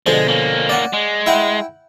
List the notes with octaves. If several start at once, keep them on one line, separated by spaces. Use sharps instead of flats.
B2 D3 F3 G#3
A#3 C#4
D5 F#5
G#3
E4 F#5 G5